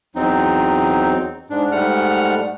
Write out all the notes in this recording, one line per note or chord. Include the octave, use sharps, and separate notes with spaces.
E2 F#3 C4 D#4
G#2 D4
G#2 G3 A3 F#5 F6